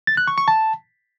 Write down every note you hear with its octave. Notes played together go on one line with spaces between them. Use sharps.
A6
F#6
C#6
C#6
A5